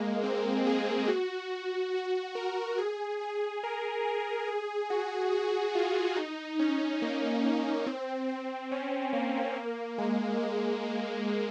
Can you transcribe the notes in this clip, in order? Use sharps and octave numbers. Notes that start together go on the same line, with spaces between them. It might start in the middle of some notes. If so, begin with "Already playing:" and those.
Already playing: G#3 A#3
C4
G#4
F#4
F#4
A#4
G#4
G#4
A#4
G#4
G#4
F#4
F#4
F4
D#4
C#4
A#3
A#3
C4
C4
C#4
A#3
A#3
G#3
G#3
A#3